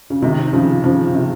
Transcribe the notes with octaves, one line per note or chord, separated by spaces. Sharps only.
C#3
C3 D#3
C#3 F3
C#3 F3
C3